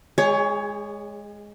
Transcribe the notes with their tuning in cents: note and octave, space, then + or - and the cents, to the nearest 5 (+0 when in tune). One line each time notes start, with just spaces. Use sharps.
G#3 +0 G#4 -35 C#5 +20